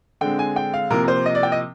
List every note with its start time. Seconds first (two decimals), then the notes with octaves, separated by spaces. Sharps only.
0.21 D3 G#3 C4 G5
0.39 G#5
0.56 G5
0.74 F5
0.90 C3 F3 A#3 A#4
1.04 A#4
1.08 C5
1.26 D#5
1.35 D5
1.43 G5
1.52 D#5